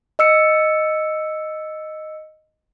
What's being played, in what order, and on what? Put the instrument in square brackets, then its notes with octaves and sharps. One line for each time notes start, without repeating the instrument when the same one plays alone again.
[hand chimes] D#5 E6 C#7